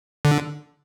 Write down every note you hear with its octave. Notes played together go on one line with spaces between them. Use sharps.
D3